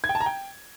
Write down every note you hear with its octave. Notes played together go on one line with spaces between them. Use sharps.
G#6
G5
A5
A#5
G5